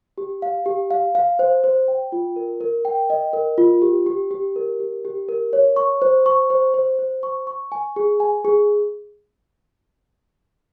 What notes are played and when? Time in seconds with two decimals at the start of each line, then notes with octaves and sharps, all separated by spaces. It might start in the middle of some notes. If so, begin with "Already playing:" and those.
0.18 G4
0.42 F5
0.66 G4
0.91 F5
1.15 F5
1.39 C5
1.64 C5
1.88 G5
2.12 F4
2.36 A#4
2.61 A#4
2.85 G5
3.10 D#5
3.33 A#4
3.58 F4
3.82 G4
4.06 G4
4.31 G4
4.56 A#4
4.80 G4
5.05 G4
5.29 A#4
5.53 C#5
5.76 C#6
6.02 C5
6.26 C#6
6.50 C5
6.74 C5
6.99 C5
7.23 C#6
7.47 C#6
7.72 G#5
7.96 G#4
8.20 G#5
8.45 G#4